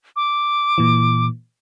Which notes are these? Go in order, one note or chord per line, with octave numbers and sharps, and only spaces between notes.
D6
A#2 E3